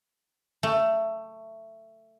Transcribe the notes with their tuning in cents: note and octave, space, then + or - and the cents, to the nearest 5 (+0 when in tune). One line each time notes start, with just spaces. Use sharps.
A3 +15